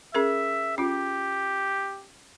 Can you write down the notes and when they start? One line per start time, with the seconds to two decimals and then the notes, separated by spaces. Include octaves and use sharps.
0.15 C#4 G#4 A#4 E5
0.78 C#4 F4 G4